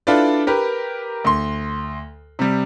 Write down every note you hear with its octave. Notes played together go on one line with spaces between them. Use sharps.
D4 E4 F4 A4 B4 D5
G4 A#4 B4
D2 C6
C3 G3